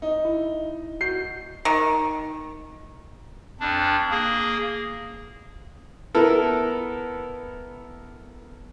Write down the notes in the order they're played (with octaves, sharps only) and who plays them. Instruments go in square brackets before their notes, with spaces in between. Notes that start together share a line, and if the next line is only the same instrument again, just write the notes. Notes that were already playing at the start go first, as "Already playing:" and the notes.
[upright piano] D#4
[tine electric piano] E4
[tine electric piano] F#4 G6 [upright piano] C7
[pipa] D#3
[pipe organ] F2 D4
A#3 G#4
[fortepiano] B3 E4 A4 A#4